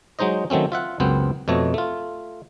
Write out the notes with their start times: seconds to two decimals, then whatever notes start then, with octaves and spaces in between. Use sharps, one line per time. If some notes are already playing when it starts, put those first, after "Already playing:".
0.19 F#3 G#3 D#4 C5 D#5
0.50 D#3 F#3 A3 C4 C#4
0.72 F4 E5 F#5
1.00 C#2 F#2 B3 C4 C5
1.48 F2 B2 A3 C#5 D#5
1.74 A3 F4